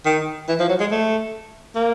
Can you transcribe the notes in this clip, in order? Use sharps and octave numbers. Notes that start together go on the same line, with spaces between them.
D#3
E3
F3
F#3
G#3
A3
A#3